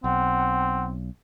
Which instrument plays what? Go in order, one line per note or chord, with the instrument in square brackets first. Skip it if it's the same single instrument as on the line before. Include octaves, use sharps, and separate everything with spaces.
[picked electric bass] B1 [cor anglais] C4 [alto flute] F#5